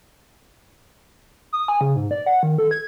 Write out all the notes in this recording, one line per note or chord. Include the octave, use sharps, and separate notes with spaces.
D#6
G#5
C#3
G#2
D5
F#5
D#3
A4
G#6